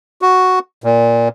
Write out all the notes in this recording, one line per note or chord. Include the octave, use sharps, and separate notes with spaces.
F#4
A#2